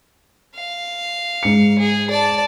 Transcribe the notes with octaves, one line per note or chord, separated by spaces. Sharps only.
F5
G#2 C#7
G#4
D5 A5